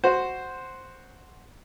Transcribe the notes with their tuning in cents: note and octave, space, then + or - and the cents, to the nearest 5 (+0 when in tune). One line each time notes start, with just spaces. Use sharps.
F#4 +0 C5 +0